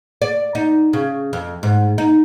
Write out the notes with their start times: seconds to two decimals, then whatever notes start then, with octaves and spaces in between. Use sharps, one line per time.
0.22 D5
0.55 D#4
0.93 C#3
1.33 F2
1.63 G#2
1.98 D#4